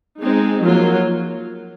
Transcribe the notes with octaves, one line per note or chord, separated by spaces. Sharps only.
G#3 C4 D#4
F3 F#3 A#3 F4